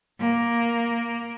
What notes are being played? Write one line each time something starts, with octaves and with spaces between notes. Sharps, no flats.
A#3